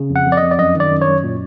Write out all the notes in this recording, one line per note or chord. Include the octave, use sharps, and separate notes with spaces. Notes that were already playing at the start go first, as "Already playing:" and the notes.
Already playing: C#3
F2
F#5
F2
D5
D#5
F2
D5
F#2 D#5
D#3 D5
F#2
C#5
F#2
A#2